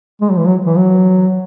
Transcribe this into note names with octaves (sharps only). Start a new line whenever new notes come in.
G#3
F#3
E3
F#3
E3
F#3